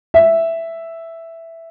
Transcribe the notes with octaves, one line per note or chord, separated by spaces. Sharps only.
E5